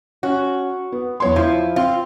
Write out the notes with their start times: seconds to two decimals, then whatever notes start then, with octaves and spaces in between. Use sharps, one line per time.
0.23 C#4 F#4
0.92 B3
1.20 E2 C#5 C6
1.36 F3 E4
1.76 C4 F4